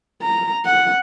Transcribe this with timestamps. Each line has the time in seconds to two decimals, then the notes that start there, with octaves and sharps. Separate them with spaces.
0.22 A#5
0.65 F#5